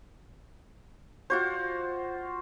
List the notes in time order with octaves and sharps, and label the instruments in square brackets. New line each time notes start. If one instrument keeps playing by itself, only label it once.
[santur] F4 F#4 C5